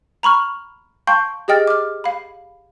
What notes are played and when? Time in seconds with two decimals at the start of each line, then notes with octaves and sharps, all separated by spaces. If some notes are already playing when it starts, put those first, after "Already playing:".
0.23 A#5 B5 C#6 F6
1.07 F5 G5 A5 C6 C#6 G6
1.48 G4 G#4 D#5 G5 F6 A6
1.68 D6 F6
2.04 F5 B5